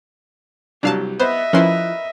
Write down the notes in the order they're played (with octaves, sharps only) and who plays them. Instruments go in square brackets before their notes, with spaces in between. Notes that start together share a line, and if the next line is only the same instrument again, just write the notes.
[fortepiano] C2 F#3 [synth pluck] D4 F5 A5 [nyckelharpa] G4
[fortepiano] B3 [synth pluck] C5 [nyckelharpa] D#5 E5
[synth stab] F3 E4 [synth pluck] C#4 C6 [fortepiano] A#4 B4